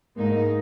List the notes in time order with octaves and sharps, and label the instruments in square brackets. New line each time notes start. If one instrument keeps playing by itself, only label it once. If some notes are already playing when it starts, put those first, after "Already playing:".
[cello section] G#2 G#3 D#4 [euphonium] A#3